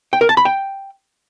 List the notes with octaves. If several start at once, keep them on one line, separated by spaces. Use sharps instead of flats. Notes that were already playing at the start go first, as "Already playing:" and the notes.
G5
A#4
A5
B5
G5